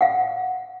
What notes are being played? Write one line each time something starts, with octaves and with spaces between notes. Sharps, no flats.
F5 F#5